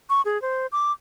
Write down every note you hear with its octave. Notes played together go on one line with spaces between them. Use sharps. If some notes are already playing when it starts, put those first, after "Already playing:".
C#6
G#4
C5
D6